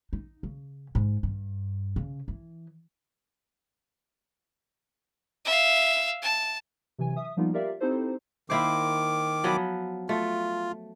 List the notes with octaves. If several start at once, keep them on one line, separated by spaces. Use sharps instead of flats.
D#4
C#3
G#2
G2
C#3
E3
E5 F5
A5
C3 E3 F#3 G#5
E5 D#6
F3 G3 A#3 B3 D#4 F4
F4 G4 A#4 D5 E5 F5
C4 D#4 E4 G4 A4 C5
D#3 A#3 E4 C5 D6
F3 F#3 B3
A3 F4